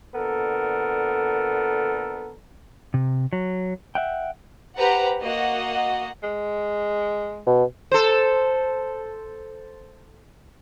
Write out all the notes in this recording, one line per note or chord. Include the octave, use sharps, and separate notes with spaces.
A#2 D3 B3 A4 A#4
C3
F#3
E5 F#5 G5
G4 B4 C5 F#5 A#5
A#3 F#4 D#5 F#5
G#3
B2
A4 C5